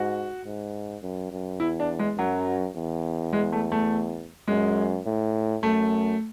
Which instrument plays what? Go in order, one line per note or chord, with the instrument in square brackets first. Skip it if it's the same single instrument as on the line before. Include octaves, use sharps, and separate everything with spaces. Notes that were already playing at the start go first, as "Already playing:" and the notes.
Already playing: [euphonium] G#2 [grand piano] F#4
[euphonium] G#2
F#2
F#2
[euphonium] E2 [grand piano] E4
[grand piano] D4
G#3
[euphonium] F#2 [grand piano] F#3
[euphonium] E2
[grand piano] G#3
A3
A3
[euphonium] F#2 [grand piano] G#3
[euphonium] A2
[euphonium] F#2 [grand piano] A3